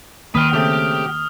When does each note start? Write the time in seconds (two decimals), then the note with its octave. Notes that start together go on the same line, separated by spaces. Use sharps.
0.35 D#3 A#3 B4 G5 D#6 F6
0.53 C#3 A3 C4 G4